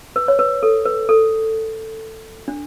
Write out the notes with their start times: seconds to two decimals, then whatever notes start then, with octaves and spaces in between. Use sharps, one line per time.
0.16 B4
0.28 C#5
0.39 B4
0.63 A4
0.86 B4
1.09 A4
2.48 D4